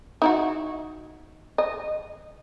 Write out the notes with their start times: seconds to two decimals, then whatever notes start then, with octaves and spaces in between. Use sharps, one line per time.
0.22 D#4 E4 F#4
1.58 D#5